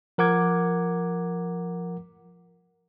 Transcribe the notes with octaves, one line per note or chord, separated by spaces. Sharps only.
F3 A#4 F#5 D6 G#6